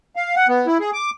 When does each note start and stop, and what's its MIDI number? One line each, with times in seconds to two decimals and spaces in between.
0.16 0.35 77
0.36 0.47 78
0.48 0.67 59
0.67 0.78 64
0.80 0.91 68
0.93 1.10 86